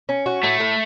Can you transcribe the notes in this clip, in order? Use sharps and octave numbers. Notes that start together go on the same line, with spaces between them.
C#4
F#4
A2 A3
A2